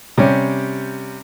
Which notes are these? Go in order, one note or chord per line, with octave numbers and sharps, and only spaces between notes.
C3 G3 C#4